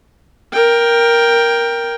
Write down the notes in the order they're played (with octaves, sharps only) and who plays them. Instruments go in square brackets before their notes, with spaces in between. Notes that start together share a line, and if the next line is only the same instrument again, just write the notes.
[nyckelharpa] A#4 G5